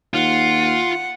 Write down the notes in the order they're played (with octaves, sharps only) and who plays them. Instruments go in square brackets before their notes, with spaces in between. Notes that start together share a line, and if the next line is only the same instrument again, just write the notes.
[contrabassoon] D#2 [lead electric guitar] F4 [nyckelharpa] F#5